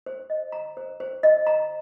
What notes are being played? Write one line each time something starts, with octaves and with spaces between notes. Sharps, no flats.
C5
D#5
A#5
C5
C5
D#5
A#5